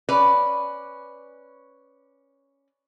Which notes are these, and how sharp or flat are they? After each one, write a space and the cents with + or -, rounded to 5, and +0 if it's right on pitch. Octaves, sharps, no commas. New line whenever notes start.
C#4 +0 B4 +0 D5 +0